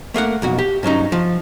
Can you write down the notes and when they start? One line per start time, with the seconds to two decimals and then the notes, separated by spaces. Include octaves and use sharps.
0.14 A3 A#3 D#5 F#5
0.42 B1 F2 F#4
0.58 G4
0.83 G2 F#3 C#4 D#4
1.12 F3